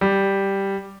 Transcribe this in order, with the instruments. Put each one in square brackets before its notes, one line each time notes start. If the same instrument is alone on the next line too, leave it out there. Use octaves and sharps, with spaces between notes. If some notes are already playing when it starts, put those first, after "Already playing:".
[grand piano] G3